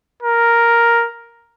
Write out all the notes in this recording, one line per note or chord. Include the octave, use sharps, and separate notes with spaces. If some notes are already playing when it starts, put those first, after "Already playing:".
A#4